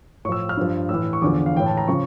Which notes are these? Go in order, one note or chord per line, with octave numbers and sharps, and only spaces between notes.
A2 F3 C#6 E6
F6
G2 F3
A2 E3 E6
C#6
E2 D3 F3 D6
F5
A2 E3 G5
A5
A#5
C#3 F3 C#6